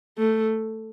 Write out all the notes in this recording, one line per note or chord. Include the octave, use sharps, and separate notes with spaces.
A3